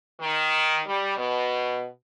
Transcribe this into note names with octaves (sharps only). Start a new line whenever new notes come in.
D#3
G3
B2